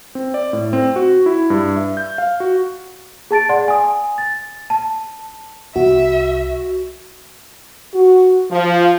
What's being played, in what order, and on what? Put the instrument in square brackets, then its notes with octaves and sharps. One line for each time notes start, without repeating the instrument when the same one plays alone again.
[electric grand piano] C4
D5
A2
C4
F#4
E4
G2
E5
G6
F5
F#4
[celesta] G#4 A5 A6 D7
D5 F#5 C6
G#5 D#6
A6
A5
[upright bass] C2 [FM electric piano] F#4 [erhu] E5
[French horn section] F#4
F3